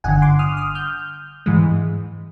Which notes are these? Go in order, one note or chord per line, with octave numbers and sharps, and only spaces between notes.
G1 G2 D3 F#5 G#5
C6 D6
D#6 F6
D#6 F6
F6 G6
G#2 E3 G#3